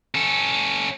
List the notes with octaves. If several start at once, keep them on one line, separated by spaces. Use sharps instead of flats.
C#4 A4